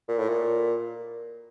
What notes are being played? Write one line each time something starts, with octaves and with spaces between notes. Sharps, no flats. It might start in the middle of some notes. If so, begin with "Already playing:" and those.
A#2
A2
A#2